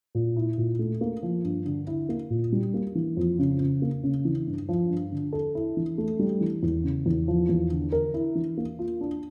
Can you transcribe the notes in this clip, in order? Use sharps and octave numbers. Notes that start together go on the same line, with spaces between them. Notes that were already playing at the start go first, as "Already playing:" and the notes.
A#2
E4
A#2
A3
A#3
F3
G2
D3
E4
A#3
A#2
G3
A#3
E3
F2
C#3
C#3
A#3
C#3
E3
G2
F3
G2
D3
A4
E4
E3
A3
G3
E3
E2
C#3
E2
F3
E2
D3
A#4
E4
E3
A#3
F4
D4